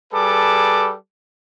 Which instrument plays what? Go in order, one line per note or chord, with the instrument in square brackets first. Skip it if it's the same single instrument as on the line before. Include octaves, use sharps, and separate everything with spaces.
[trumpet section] G3 G#4 A4 B4 A5 D6